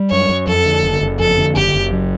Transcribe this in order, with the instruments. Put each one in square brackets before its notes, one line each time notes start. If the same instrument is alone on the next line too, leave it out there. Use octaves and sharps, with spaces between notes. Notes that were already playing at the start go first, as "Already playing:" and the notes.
Already playing: [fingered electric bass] G3
[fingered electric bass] F#2 [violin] C#5
[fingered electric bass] F#2
[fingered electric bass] F2 [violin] A4
[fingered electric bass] D3
F#1
F#1
[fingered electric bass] F2 [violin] A4
[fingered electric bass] D3
[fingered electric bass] F#1 [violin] G4
[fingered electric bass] F#1
F#2